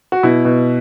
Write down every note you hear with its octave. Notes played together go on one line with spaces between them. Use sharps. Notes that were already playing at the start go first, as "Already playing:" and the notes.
F#4
B2 E4
B2